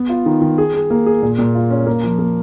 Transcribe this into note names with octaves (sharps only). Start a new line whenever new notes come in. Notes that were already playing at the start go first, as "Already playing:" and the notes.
Already playing: B3
F4
D#3
D#3
G#4
G#4
A#3
G#4
A#2
A#2
F4
C#4
A#3
F3
A#3